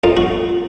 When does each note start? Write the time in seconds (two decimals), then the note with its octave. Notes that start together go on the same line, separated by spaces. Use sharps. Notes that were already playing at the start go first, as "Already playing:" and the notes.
0.04 F2 F4
0.17 F#4